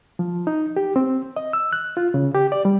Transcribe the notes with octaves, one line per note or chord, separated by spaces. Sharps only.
F3
D#4
G4
C4
D#5
E6
F#6
F4
C#3
G4
D5
G3